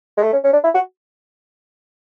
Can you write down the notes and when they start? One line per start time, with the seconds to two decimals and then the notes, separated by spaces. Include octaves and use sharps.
0.17 G#3
0.23 A3
0.32 C#4
0.44 C#4
0.53 D4
0.64 E4
0.74 F#4